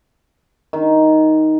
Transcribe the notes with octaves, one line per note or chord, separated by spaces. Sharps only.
D#3